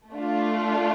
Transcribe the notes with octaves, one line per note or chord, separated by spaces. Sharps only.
A3 D4 F4